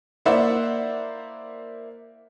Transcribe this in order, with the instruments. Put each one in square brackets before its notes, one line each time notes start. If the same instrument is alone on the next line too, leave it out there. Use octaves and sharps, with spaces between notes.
[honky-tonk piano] A#3 E4 C5 D5 E5 F#5